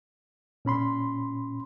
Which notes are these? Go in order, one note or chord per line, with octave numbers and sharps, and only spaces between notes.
A#2 C#4 B5 C6